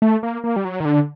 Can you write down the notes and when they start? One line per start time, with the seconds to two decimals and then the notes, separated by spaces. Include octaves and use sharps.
0.02 A3
0.23 A#3
0.44 A#3
0.56 G3
0.65 F#3
0.80 D#3
0.85 D3